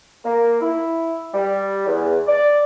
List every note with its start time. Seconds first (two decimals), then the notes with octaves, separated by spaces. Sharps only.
0.25 A#3
0.61 E4
1.34 G3
1.86 E2
2.27 D5